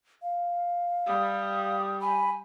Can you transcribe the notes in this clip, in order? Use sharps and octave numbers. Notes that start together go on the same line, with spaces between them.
F5
G3 D#6
G#5 B5